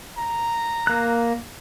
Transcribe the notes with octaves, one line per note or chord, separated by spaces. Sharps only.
A#5
A#3 F#6